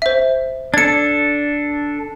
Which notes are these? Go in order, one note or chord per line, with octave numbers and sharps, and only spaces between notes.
C5 E5
D4 A4 G#6 C#7